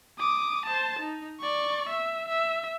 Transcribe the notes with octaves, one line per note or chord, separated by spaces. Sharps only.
D6 D#6
C5 A5
D#4
D5 C#6
E5
E5